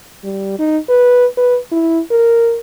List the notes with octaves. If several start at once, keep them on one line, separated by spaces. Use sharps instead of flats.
G3
D#4
B4
B4
E4
A#4